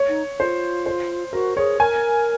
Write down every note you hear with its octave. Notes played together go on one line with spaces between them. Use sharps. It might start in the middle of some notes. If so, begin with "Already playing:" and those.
Already playing: C#5
D#4
F4 C5
C5
F#4 A#4
G#4 C#5
A#4 G#5